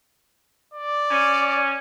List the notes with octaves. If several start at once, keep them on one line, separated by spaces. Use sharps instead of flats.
D5
C#4